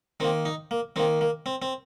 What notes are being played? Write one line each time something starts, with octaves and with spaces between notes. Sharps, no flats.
D#3 A#3 C4
D#4
A#3
D#3 A#3 C4
A#3
C4
C4